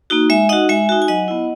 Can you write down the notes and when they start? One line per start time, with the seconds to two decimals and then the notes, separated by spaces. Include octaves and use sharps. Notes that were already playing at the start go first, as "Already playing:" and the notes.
0.10 A#3 D#4 F#4
0.30 G#3 E5 G#5
0.49 D#4 F#4 D#5 F#5
0.69 G#3 E5 G#5
0.89 D#4 F#4
1.02 G#5
1.08 F#3 D#5 F#5
1.28 B3 E4